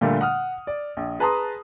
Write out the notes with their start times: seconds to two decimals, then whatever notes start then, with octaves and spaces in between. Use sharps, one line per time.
0.01 A#2 D3 G3 A3 A#3
0.21 F#5 D#6 F6
0.67 D5
0.97 A#1
1.19 G#4 B4 A5 A#5 C6 D#6